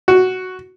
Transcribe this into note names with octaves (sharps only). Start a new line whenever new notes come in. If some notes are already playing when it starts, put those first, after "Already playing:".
F#4